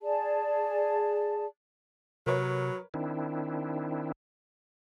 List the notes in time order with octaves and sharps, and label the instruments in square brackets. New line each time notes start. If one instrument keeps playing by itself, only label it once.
[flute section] G#4 D5 A5
[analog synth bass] C3 [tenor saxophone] F#3 [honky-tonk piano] A#4 B4 C#5
[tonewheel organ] D#3 C4 D4 E4